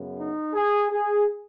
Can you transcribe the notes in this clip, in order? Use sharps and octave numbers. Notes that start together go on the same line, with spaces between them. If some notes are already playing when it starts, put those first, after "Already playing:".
Already playing: F#2 C#3 B3
D#4
G#4
G#4